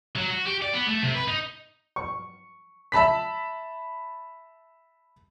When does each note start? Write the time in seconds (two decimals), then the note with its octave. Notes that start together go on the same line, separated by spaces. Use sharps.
0.16 F#3
0.30 F#4
0.47 G4
0.62 D5
0.73 B3
0.87 A3
1.03 C3
1.14 B4
1.28 D#4
1.96 C#6
2.92 E5 A5 B5 B6